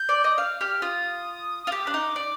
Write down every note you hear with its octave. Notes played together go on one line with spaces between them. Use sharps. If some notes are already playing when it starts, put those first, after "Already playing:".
Already playing: G6
D5
D#5
F5 F6
G4 F6
F4 D#6
D#6
F4
G4 D6
D4
D#4
D5